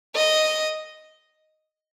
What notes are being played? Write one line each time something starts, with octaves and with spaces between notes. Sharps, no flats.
D#5